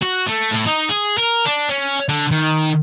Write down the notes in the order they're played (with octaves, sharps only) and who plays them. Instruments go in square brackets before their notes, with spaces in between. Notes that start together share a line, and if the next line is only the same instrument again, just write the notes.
[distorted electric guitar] F#4
A3
A2
D#4
G#4
A#4
D4
C#4
D3
D#3